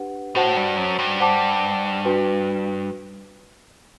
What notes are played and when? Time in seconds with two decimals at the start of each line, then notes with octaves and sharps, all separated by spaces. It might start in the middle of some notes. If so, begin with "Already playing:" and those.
Already playing: D4 G4 B4 F#5
0.35 A2 F#4 C5 F#5 A5
0.57 G2
0.77 F#2
0.99 G2
1.20 C5 F#5 A5 D6
2.05 D4 F#4 B4